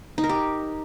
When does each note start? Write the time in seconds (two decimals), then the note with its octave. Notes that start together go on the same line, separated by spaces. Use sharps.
0.18 D#4
0.24 A#4
0.29 G4